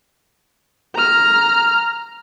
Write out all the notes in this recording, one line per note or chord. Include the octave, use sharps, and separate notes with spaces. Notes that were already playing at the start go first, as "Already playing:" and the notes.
A#5 F6